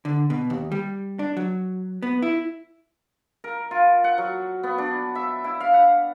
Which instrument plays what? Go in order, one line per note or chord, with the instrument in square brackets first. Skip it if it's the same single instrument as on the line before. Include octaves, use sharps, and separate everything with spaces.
[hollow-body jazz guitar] D3
B2
D#2
G3
D4
F#3
B3
E4
[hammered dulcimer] A#4
F4
F#5
F#3
B3
D4
E5
E4
F5
F#5